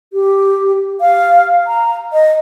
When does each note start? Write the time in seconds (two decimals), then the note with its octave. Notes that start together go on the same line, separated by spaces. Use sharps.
0.13 G4
1.01 F5
1.67 A#5
2.13 D#5